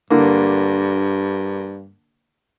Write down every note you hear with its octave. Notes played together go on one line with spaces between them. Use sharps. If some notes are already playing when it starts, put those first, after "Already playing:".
G2 D3 A#3